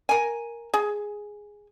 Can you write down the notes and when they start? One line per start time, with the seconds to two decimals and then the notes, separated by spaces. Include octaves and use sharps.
0.09 A#4 G#5
0.74 G#4